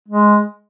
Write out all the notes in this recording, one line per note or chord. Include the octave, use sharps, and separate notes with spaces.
G#3